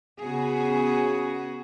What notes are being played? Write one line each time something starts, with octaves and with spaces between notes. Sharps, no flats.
C#3 B3 F#4 G#4